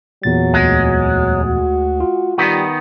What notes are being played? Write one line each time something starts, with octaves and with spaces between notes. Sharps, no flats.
E2 A#2 F#3 A6
D2 G#3
F#4
F4
D#3 G3 B3